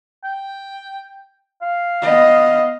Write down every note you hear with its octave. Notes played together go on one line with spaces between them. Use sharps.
G5
F5
B3 D#5